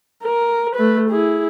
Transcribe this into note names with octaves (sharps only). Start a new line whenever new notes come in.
A#4
A3 B4
E4 G#4